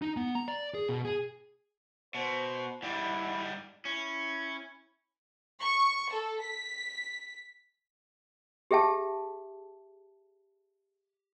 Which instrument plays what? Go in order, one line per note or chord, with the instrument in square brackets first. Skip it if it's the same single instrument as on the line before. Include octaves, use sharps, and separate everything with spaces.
[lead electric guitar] D#4
B3
A#5
D5
G#4
B2
G#4
[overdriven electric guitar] B2 [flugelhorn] C5
[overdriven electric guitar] G#2 G3 [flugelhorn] E4
[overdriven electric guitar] C#4 [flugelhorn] E4
[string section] C#6
A4
B6
[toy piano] G4 G#4 E5 G5 A5